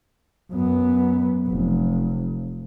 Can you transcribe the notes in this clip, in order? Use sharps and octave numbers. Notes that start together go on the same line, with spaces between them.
F#2 B3
F1